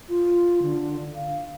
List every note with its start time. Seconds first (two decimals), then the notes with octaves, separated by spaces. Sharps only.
0.09 F4
0.62 D3
1.15 F5